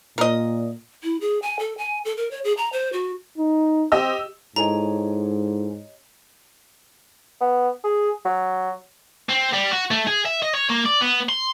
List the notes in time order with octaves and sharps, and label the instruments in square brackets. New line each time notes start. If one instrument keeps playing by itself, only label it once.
[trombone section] A#2 [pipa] A#4 D#5
[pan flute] E4
G#4
G#5
A4
G#5
A4
A#4
C#5
G#4
A#5
C5
F#4
[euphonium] D#4
[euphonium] C4 [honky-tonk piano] G4 D#5 E6
[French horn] G#2 [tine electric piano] E4 A4 G#5 [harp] G4 C#5 D#5 [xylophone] A#5
[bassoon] B3
G#4
F#3
[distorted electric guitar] C4
G3
F#4
A3
G#4
E5
D#5
C#5
A#3
D5
B3
C6